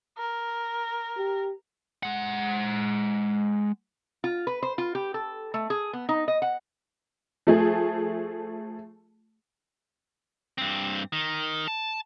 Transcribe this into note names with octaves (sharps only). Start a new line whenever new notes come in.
A#4
G4
G#3 F#5
F4
B4
C5
F4
G4
A4
A3
G#4
B3
D#4
D#5
F#5
F3 A3 G#4
G2 C4
D#3
A5